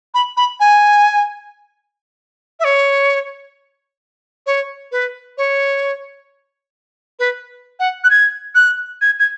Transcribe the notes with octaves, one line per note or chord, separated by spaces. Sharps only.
B5
B5
G#5
E5
C#5
C#5
B4
C#5
B4
F#5
F#6
G#6
F#6
G#6
G#6